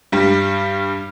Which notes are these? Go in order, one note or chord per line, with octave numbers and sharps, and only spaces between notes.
G2 G3